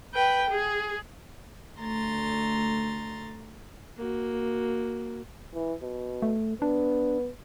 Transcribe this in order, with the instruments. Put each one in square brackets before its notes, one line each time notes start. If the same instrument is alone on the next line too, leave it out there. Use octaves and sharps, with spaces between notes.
[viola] B4 G5
G#4
[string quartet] D2 A3 A#5 C6 A6
[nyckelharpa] A#3 F#4
[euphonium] E3
B2
[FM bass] A3
[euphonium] B3 [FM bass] D4